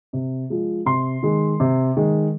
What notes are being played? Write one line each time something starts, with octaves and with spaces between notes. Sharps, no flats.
C3
F3 G#3
C3 C6
D#3 G#3
C3
D#3 G#3